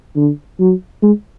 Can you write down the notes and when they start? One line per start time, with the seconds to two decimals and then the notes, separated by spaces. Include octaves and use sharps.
0.16 D3
0.60 F#3
1.03 G#3